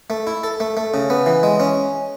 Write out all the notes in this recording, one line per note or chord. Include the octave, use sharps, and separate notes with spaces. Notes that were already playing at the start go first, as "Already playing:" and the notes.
A3
E4
A4
A3
A3
C#3
B3
E3
G#3
C#4